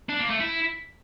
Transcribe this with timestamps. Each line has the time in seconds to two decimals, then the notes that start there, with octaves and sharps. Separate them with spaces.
0.09 D4
0.20 A#3
0.30 A3
0.40 E4